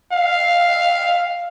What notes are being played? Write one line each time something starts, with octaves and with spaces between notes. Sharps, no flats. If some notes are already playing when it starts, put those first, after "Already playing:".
F5